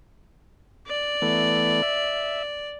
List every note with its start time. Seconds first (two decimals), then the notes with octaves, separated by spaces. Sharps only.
0.87 D5
1.22 E3 A3 B3
1.82 E5